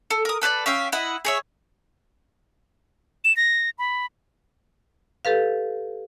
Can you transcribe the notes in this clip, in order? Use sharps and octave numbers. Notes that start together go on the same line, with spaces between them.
A4
A#4 D#6
A4 B4 C5 D5
C#4 E5 F5 G5
E4 D#5 F#5
G#4 C#5 E5
E7
A#6
B5
G4 A4 B4 F5